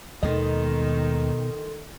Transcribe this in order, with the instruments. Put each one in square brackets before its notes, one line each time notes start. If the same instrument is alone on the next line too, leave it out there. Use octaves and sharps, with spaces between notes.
[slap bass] D#2 G#3 B3 [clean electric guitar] B2 D#5 [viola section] D#3 [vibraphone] A4 C6